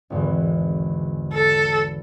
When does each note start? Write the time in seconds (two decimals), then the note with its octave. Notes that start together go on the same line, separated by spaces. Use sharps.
0.10 G#1 E2 D3
1.33 A4